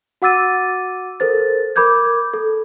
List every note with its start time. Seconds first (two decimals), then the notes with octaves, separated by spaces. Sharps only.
0.22 F#4 F#5 D6 E6 A6 D#7
1.20 A4 A#4 C5 A6
1.76 A#4 B5 D6 G6 G#6
2.34 A4